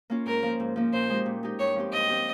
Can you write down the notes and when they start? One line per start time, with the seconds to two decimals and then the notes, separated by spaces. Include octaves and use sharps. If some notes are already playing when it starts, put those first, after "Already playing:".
0.10 A#3 C#4 F4
0.26 G#2 A#4
0.43 F3 A#3
0.60 G#2
0.76 F3 A#3
0.93 A#2 C5
1.09 G#3 D#4 G4
1.26 A#2
1.43 G#3 D#4 G4
1.59 G2 C#5
1.76 F3 C4 G4
1.92 G2 D#5
2.09 F3 C4 G4